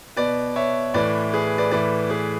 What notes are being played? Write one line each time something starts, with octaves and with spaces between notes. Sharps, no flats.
B2 B4 D5
C#5 E5
A2 E3 B4 D5
G#4 B4
B4 D5
A2 E3 B4 D5
G#4 B4